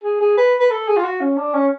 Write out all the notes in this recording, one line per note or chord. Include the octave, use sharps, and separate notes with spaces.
G#4
G#4
B4
B4
A4
G#4
F4
F#4
C#4
D4
C#4